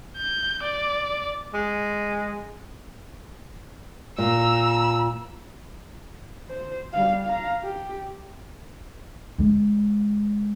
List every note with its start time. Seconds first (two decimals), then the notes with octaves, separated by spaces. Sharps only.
0.17 G6
0.64 D5
1.53 G#3
4.18 A#2 A#5 E6
6.47 C5
6.93 G3 F5
7.25 F5 A#5
7.64 G4
9.38 G#3 B3